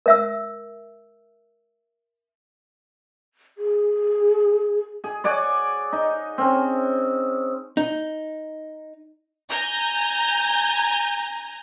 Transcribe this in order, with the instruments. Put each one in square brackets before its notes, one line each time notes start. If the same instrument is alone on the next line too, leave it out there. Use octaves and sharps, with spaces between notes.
[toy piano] A#4 E5 E6
[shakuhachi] G#4
[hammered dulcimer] G#4
C#5 D5 F#5 G#5
D#4
C4 C#4
[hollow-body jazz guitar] D#4
[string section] G#5 A#5 G6